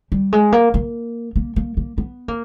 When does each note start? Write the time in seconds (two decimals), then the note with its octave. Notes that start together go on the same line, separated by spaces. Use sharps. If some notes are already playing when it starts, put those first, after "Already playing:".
0.12 G3
0.33 G#3
0.52 A#3
0.74 A#3
1.36 A#3
1.56 A#3
1.77 A#3
1.98 B3
2.28 A#3